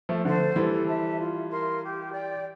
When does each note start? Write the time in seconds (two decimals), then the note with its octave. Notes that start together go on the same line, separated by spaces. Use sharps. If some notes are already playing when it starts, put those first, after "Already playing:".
0.09 F3 A3
0.25 D3 F3 A4 C5
0.56 E3 G3 A4
0.87 E5 A5
1.19 F4
1.50 A#4 F5 C6
1.81 G4
2.12 D5 G5